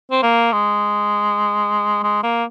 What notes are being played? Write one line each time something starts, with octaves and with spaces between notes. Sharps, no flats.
C4
A#3
G#3
G#3
A#3